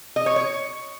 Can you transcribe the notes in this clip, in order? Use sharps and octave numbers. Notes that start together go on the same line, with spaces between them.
D#5
C#5
C#5